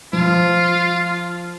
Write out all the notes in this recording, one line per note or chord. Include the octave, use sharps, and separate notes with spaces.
F3 F4